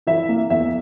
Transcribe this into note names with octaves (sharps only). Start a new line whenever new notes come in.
E3 E5
A#3
E2 E5